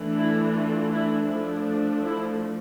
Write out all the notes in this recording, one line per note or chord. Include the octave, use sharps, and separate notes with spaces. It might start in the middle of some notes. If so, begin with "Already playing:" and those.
Already playing: E3 A3 D4
E4
F4
E4
F3 A3 D4 E4
E4